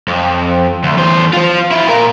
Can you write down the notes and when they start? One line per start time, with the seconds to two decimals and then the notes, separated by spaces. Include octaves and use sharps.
0.08 F2
0.83 D2
0.97 E2 C5
1.33 F4 C5
1.71 E4 F4
1.89 A#2 A#4